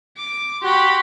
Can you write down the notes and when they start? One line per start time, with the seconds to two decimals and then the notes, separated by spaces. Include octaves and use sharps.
0.17 D6
0.62 F#4 G4 B5 C6